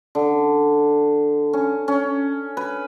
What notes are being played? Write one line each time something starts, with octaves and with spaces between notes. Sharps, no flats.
D3
C#4
C#4
B4